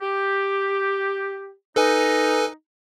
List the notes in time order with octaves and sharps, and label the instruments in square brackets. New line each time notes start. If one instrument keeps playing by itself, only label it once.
[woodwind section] G4
[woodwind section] D#4 [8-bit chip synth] A4 B4 G#5